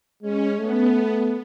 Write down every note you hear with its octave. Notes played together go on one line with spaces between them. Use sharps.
G#3 C#4
A3 B3